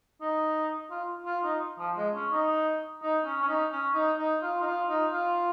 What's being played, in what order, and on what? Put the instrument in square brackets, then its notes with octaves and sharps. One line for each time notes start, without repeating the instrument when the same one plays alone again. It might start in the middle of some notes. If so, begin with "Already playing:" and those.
[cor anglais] D#4
F4
F4
D#4
F3
G#3
C#4
D#4
D#4
C#4
C#4
D#4
C#4
D#4
D#4
F4
D#4
F4
D#4
F4